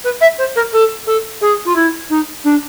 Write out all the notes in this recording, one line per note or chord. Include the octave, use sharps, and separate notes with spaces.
B4
E5
C5
A#4
A4
A4
G#4
F4
E4
D#4
D4